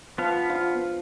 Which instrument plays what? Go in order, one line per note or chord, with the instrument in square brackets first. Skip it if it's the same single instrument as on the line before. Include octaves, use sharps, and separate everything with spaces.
[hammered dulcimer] F3 [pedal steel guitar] B3 F5
[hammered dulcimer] F4